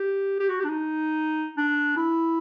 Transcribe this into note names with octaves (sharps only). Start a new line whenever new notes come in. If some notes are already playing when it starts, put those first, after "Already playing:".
Already playing: G4
G4
F#4
G4
D4
D#4
D4
E4